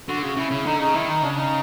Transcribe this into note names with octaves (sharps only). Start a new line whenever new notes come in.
D3 F#4
C#3 F#4
C#3 E4
C#3
D3 D#4
C#3 D#4
D#3 E4
D#4
C#3 D4
D#4